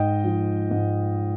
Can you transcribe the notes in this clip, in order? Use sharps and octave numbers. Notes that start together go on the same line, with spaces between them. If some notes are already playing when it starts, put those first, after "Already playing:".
Already playing: G#2 D#5 G5
F3
G#2